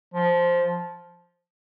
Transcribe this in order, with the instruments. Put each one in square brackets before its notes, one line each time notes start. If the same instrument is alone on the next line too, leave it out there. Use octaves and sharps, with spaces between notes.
[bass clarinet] F3